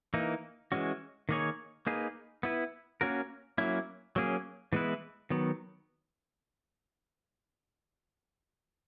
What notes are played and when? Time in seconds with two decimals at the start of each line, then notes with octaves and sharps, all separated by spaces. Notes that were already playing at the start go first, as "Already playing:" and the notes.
0.14 E3 A#3 D#4
0.72 E3 G#3 C#4 F#4
1.29 D#3 A#3 D#4 G#4 C#5
1.87 A#3 D#4 G#4 B4
2.43 B3 E4 B4
3.01 A#3 C#4 F#4 A#4
3.58 F#3 A#3 C#4 E4
4.16 F#3 A#3 C#4 G#4
4.73 E3 G#3 B3 E4 B4
5.30 D#3 F#3 B3